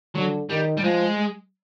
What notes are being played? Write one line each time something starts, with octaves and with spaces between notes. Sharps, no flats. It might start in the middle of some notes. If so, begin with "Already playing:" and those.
D3 F#3
D#3 G3
G3
F3 G#3